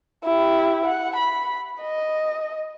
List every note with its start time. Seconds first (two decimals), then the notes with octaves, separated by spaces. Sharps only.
0.24 E4 G4
0.85 F#5
1.16 B5
1.81 D#5